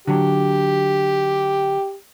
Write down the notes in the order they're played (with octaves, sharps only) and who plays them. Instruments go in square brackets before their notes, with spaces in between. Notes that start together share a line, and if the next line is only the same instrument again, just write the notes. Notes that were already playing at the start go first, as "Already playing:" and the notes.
[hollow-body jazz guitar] D3 F#3 [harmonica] G4